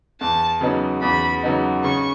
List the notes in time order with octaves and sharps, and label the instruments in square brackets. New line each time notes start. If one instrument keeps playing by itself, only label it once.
[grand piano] E2 [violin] A5
[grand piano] C#3 F#3 B3 D#4
[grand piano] E2 [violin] B5
[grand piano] C#3 F#3 B3 D#4
[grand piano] C#3 [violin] C#6